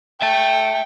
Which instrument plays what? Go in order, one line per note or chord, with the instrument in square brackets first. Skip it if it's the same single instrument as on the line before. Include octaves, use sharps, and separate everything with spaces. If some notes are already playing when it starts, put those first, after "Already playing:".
[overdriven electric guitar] E5 A5 [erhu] G5